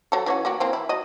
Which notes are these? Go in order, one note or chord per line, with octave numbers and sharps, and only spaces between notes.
F#3 A4
E3 C#4 F#4
A#3 F#4 G4
E3 A#3 C4
E4
F#4 D#5